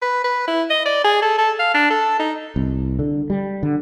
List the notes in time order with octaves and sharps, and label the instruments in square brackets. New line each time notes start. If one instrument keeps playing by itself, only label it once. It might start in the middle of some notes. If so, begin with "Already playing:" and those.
[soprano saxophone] B4
B4
E4
D#5
D5
G#4
A4
A4
F5
D4
A4
D#4
[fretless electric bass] C2
D3
G3
D3